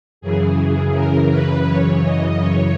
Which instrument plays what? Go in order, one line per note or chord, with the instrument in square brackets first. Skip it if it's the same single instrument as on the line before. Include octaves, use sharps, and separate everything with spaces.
[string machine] F#2 C#3 E3 G#4
A#4
B4
C#5
D#5
C#5